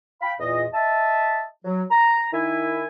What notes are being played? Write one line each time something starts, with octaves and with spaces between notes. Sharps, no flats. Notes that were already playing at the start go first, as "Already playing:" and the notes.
F5 G5 B5
E2 A#2 D#5
D#5 E5 A5
F#3
A#5
D#3 E4 E5 G#5